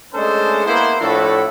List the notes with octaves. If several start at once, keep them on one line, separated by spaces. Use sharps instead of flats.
G#3 A3 C#4 D4 A4 C5
A#3 B3 E4 C5
A2 F3 D4 E4 F#4 A4